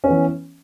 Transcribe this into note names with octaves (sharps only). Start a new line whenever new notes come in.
E3 B3 C#4